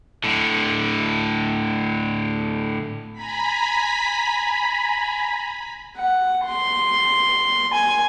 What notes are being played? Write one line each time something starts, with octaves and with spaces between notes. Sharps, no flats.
A2 D3
G#5 A#5 B5 B6
F#5
C6
G#5